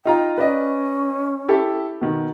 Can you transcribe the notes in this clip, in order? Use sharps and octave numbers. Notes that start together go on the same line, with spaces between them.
D#4 F4 G5 A#5
C#4 B4 D5 D#5
E4 G4 A4
B2 D#3